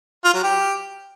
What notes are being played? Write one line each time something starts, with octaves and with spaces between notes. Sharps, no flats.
F4
F#3
G4